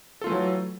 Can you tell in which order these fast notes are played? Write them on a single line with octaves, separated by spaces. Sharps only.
A4 F4 A3 E3 F#3